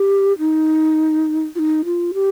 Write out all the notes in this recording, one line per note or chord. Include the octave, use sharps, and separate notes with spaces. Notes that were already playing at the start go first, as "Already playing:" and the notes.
Already playing: G4
D#4
F4
D#4
F4
G4